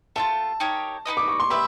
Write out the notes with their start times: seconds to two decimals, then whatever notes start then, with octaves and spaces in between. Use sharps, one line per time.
0.16 A3 D4 F4 A5
0.60 D#4 G4 A#4 C#5
1.06 D#4 F#4 B4 D#5
1.17 D6
1.28 C#6
1.40 C6
1.50 G4 B4 E5 B5